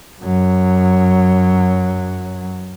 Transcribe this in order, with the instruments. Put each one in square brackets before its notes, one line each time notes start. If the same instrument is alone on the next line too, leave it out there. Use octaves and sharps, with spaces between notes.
[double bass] F#2 F#3